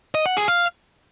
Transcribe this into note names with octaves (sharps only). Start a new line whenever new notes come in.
D#5
F#5
G#4
F5